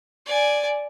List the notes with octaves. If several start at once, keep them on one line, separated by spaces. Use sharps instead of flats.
D5 G#5